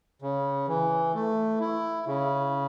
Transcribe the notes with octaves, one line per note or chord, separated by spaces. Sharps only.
C#3
E3
A3
E4
C#3